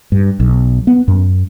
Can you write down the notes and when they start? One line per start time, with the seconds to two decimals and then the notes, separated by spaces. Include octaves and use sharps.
0.12 G2
0.40 B1
0.87 B3
1.08 F#2